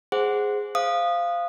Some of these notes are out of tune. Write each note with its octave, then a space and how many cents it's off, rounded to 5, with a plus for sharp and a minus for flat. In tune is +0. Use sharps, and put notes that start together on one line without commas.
G#4 +0 C5 +0 F#5 +0
C5 +0 F5 -10 D#6 -20